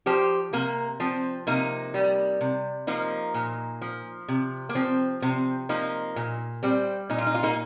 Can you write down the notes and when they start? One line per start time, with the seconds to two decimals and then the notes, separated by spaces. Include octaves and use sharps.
0.06 F3 G4 C5
0.53 C3 A#3
1.00 F3 C4
1.47 C3 A#3 D#4
1.94 G3
2.41 C3
2.87 F3 A#3 D#4
3.34 A#2
3.82 F3
4.28 C3
4.69 A#3
4.75 F3 C4
5.22 C3 C4
5.69 F3 A#3 D#4
6.16 A#2
6.63 G3 C4
7.10 A#2 D#4
7.18 F4
7.27 D#4
7.35 F4
7.43 A#3 D#4